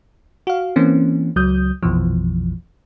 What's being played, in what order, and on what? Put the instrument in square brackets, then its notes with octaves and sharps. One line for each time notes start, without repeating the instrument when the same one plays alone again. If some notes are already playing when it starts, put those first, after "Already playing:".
[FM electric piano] F#4 F5
E3 A#3 C4 C#4
C#2 F#3 D#6 G6
A#1 F2 B2 E3 F3